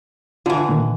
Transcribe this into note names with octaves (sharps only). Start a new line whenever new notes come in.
D3 E3 D4 F4
A#2 D#3